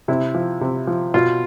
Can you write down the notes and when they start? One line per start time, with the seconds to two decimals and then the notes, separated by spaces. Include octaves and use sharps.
0.08 C3 E4
0.35 F3
0.61 C3
0.87 F3
1.14 B2 F4